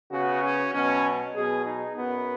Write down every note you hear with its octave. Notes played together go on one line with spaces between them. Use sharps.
C#3 B3 F#4
C#4
B2 F#3 B3 C#4
B2 F#3 B3 G#4
D#4
F#2 F#3 B3